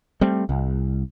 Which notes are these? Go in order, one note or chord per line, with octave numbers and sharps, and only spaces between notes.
G3 A3 C4
C2